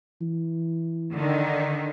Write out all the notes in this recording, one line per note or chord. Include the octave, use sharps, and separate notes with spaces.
E3
D3 D#3